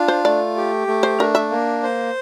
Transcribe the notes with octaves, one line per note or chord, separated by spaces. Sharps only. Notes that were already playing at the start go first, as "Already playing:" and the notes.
Already playing: D4 F4
C5
A3 D5
G4
A3
C5
D4 A#4
E5
A#3
C5